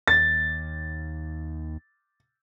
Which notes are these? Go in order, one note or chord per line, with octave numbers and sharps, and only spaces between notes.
D#2 A6